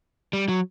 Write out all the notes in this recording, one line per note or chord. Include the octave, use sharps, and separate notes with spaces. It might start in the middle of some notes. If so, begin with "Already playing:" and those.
G3
F#3